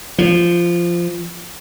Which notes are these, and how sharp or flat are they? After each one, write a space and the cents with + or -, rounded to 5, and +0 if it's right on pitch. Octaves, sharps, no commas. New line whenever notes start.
F3 -15